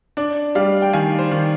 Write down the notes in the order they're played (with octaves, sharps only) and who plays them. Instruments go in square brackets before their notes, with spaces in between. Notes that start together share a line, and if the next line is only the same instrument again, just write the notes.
[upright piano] D4 [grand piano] D5
[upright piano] G3 [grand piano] D5 F5
[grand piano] G5
[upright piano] D#3 [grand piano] F5 G#5
[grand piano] C5
[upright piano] D#3